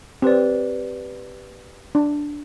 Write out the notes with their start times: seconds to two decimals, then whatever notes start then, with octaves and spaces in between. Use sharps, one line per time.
0.22 C4 G4 B4 D5
1.95 D4